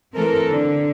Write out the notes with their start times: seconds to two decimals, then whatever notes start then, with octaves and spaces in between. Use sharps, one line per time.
0.15 E3 A3 C4 A4 A#4
0.51 D3